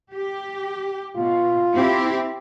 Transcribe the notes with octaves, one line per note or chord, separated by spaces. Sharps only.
G4
B2 F4
C4 E4 G4